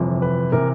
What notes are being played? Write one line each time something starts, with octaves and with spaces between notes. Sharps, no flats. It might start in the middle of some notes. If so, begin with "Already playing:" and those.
Already playing: G1 F2 C3 E3
B4
C3 E3 A#4